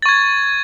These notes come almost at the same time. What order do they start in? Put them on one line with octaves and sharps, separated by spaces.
A6 C#6 G#6